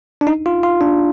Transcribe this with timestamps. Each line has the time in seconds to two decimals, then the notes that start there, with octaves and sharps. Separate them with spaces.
0.21 D4
0.27 D#4
0.46 F4
0.63 F4
0.81 D4